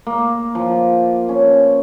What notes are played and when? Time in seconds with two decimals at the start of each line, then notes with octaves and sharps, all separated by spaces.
0.07 A#3
0.55 F3
1.29 C#4